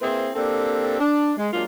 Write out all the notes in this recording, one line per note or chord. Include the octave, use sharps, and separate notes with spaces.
A#3 C4 E4 G#4 B4 C5
A#3 C4 D4 G4 A4
D4
G#3
F#3 G#3 A#3 D4 F4